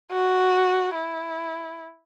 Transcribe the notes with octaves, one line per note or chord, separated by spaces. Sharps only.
F#4
E4